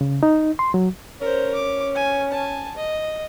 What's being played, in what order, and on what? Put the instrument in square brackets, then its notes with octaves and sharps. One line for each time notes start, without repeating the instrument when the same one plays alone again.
[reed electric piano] C#3
D#4
C6
F#3
[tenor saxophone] C#4 [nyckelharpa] A#4 C5
[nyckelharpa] D6
G#5
G#5 A5
D#5